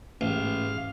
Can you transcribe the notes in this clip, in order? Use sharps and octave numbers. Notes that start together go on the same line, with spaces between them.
A1 G#2 F5